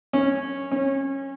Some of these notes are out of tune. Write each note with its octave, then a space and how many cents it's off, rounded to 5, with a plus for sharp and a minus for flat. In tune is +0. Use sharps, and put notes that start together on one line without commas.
C#4 -10
C#4 -25